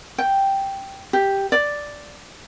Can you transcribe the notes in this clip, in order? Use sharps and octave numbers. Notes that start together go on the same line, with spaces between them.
G5
G4
D5